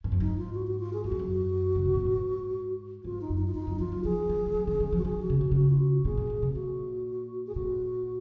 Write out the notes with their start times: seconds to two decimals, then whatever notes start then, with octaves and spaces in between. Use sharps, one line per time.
0.04 G#2
0.12 F#2
0.20 G#2 D#4
0.38 F4
0.54 F#4
0.67 F#4
0.80 F4
0.93 G#4
1.04 F#2 F#4
1.12 F2
1.19 F#2
1.75 C#3
1.85 C3
1.95 A#2
2.05 G#2
3.04 G#2 F4
3.21 D#4
3.30 F#2
3.38 D#4
3.47 F4
3.55 F#2 D#4
3.67 F#2
3.80 F3 F4
3.92 F#3
4.04 F3 G#4
4.25 F3
4.29 D#3
4.46 G#3
4.55 F#3
4.67 D#3
4.80 D#3
4.92 F3
4.98 F#4
5.05 D#3 G#4
5.22 F#4
5.30 C#3
5.38 C3 F#4
5.51 C#3 F#4
5.70 F4
5.80 F#4
6.05 A#2 G#4
6.18 A#2
6.30 A#2
6.42 C3
6.55 A#2 F#4
7.47 G#4
7.55 A#2 F#4